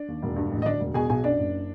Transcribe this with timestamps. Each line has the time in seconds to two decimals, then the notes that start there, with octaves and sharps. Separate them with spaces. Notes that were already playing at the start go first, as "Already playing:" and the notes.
Already playing: D4 D5
0.08 D#2
0.22 E1
0.36 G2
0.51 A1
0.62 D#5
0.66 D2 D4 D5
0.80 E1
0.94 B2 G#4 G#5
1.09 B1 G#4 G#5
1.24 F#2 D4 D5
1.39 F#1